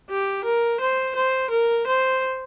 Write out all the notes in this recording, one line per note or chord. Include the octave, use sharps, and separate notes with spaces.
G4
A#4
C5
C5
A#4
C5